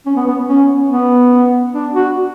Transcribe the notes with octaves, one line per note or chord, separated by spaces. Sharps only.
C#4
B3
B3
C#4
B3
D4
F#4